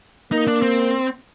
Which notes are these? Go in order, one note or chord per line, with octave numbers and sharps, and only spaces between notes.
A#3 D#4
D4
C4